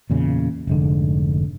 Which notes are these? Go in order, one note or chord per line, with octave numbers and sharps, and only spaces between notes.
E2 A#2 C#3
F1 G#2 D3